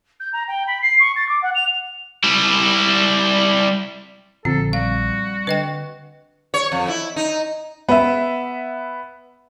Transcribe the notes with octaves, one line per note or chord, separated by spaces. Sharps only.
G6
A#5
G5
B5
C7
C#6
A6
D6
F#5
F7
G3 E4
A#1 D3 F3 C4 A4
G3 F#4 F5
D3 B4 D#5 G5
C#5
F2
E4
D#4
B3 E5